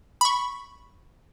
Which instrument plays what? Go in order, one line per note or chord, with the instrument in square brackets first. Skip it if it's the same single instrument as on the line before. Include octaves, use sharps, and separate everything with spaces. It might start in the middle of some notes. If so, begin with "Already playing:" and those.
[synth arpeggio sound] B5 C#6